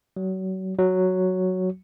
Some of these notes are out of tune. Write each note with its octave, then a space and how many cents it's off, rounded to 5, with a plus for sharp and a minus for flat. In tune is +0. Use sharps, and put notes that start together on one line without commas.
F#3 +30
F#3 +0